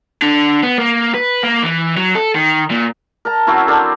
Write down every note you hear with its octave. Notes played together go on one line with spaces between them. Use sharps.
D3
B3
A#3
B4
A#3
E3
F#3
A4
D#3
A#2
A#4 A5 A#5
F#3 C4 C#4 E4
D4 A4 A#4 C5